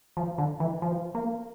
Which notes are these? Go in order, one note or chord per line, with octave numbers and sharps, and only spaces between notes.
F3
D3
E3
F3
A#3